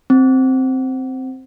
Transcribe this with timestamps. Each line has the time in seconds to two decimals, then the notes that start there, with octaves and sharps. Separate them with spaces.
0.10 C4